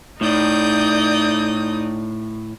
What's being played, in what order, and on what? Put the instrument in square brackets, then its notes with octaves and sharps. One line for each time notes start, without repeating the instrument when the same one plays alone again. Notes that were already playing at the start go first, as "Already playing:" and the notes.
[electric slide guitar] A2 [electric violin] D#4 [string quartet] D5 D#6 G6